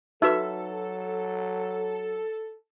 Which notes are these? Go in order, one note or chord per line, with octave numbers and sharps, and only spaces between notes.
F#3 D#4 F#4 A4 B4 E5